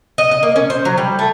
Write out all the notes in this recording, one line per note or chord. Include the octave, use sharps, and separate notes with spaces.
D#5
D#5
A#3
C#4
C5
F#3
G3
A3